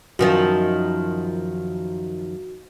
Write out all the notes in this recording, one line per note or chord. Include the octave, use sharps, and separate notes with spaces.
F#2 D#3 F3 F#4